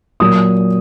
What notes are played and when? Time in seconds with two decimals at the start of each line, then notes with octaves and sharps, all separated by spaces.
0.20 A#2 F#3 D#6